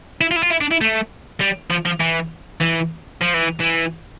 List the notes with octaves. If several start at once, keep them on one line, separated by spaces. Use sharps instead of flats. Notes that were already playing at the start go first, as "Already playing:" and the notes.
E4
F4
E4
F4
E4
D4
E4
A3
G3
F3
F3
E3
E3
F3
E3
E3